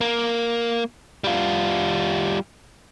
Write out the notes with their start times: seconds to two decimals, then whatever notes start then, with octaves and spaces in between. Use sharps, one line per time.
0.01 A#3
1.24 G3 F4